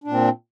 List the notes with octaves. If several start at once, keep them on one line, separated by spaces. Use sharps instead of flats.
A#2 C4 D4